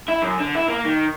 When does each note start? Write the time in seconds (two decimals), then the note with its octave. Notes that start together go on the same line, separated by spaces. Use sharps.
0.08 E4
0.22 F#2
0.40 D3
0.55 E4
0.68 A#3
0.85 D#3